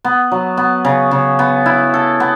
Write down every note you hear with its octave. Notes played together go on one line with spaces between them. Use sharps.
B3
F#3
B3
C#3
C#3
B3
E4
A4
B3